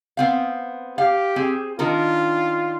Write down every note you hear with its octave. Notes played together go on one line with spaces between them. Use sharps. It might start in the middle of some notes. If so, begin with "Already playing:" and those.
B3 C4 F5
G4 F5
C4 G#4
D#3 D4 F4 A#4